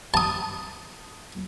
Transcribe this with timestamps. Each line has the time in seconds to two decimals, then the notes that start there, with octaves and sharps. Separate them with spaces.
0.14 A5 D#6